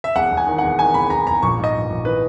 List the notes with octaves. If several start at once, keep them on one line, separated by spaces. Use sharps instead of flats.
E5
E1 F#5
E1
G#5
D#3
E1 F#5
D#3 G#5
E1 B5
E1 A#5
E1 A#5
A#1 C#6
G#2 D#5
A#1
A#1
E3 B4